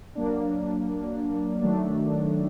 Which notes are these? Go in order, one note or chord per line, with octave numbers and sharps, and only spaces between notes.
F#3 A#3 D4
D#3 F#3 A3 D4